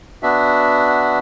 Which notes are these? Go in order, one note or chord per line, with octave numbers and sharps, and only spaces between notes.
B3 D4 F#4 E5